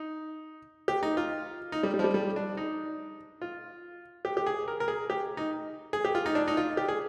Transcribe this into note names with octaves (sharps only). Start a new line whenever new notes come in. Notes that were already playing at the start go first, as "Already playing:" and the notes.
Already playing: D#4
G4
D#4
F4
D#4
G3
G3
F3
G3
G3
D4
D#4
F4
G4
G4
G#4
A#4
A#4
G#4
G4
D#4
G#4
G4
F4
D#4
D4
D#4
F4
G4
G#4